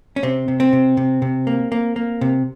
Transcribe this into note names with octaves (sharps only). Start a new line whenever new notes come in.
C#4
C3 C4
C3
C4
C3
C3
C3
A#3
A#3
A#3
C3